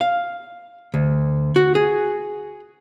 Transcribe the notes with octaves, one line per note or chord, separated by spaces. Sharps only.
F5
D2
F#4
G#4